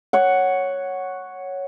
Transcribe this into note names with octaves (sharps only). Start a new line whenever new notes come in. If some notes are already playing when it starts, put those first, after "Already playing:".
C#5 F#5